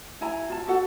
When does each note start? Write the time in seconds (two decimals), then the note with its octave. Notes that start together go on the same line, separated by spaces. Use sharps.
0.21 E4 G#5 A#5
0.50 F4 A5
0.68 F#4 A4 F#5